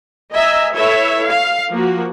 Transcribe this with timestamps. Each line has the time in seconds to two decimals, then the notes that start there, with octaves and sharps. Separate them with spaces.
0.32 D#5 E5 G#5 A#5
0.73 E4 A4 B4 C#5 E5
1.28 F5
1.71 F3 A#3 F#4